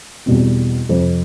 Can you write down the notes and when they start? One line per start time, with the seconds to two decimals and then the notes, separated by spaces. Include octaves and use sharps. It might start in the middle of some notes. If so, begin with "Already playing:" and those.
0.26 E2 B2 G3 C4
0.89 F2 C3 F3